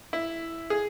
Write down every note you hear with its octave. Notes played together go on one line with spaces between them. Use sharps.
E4
G#4